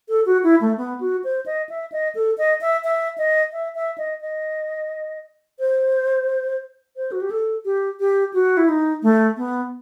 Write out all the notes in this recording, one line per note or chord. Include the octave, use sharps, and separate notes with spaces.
A4
F#4
E4
A3
B3
F#4
C5
D#5
E5
D#5
A4
D#5
E5
E5
D#5
E5
E5
D#5
D#5
C5
C5
F#4
G4
A4
G4
G4
F#4
E4
D#4
A3
B3